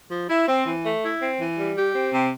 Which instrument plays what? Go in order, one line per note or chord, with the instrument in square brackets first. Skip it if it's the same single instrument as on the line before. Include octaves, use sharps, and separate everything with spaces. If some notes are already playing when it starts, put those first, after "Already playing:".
[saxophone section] F3
E4
C4
E3
A3
E4
C4
E3
G3
G4
C4
C3